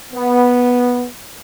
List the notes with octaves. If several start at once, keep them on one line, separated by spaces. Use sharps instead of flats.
B3